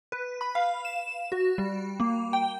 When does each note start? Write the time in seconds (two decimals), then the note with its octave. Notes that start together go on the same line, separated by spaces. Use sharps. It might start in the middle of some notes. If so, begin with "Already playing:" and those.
0.12 B4
0.41 B5
0.55 F5
0.85 E7
1.32 F#4
1.58 G3
2.00 A#3
2.33 G5